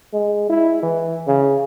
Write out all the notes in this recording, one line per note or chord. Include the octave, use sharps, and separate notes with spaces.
G#3
E4
E3
C#3